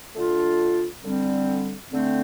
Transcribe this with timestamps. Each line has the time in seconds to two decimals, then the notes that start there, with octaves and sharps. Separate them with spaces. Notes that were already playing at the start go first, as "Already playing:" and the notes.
0.15 D3 A3 D4 F4
1.04 D3 G3 C4
1.91 D3 A3 C4